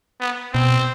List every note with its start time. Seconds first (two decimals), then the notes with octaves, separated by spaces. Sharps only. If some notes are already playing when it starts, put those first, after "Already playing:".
0.20 B3
0.53 B2 C4